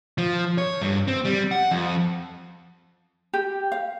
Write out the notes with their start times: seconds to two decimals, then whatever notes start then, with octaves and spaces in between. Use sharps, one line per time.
0.18 F3
0.58 C#5
0.81 G2
1.08 C4
1.25 G3
1.51 F#5
1.72 F2
3.33 G4
3.72 F5